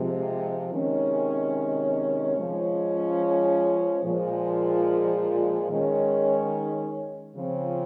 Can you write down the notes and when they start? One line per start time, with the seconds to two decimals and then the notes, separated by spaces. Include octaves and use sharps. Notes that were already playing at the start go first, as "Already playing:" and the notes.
Already playing: C3 F3 G#3
0.72 C3 D#3 G#3 C#4
2.38 F3 G#3 C#4
4.03 A#2 F3 G#3
5.70 D#3 G#3 C#4
7.35 C#3 F3 C4